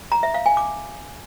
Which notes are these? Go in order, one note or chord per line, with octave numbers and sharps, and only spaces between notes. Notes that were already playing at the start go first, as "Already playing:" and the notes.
A#5
E5
F5
G#5
D6